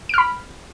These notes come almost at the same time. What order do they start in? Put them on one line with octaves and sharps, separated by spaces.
D7 F6 B5